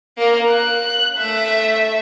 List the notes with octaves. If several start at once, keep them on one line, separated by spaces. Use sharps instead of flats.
A#3 A#4
F#6
A3 E5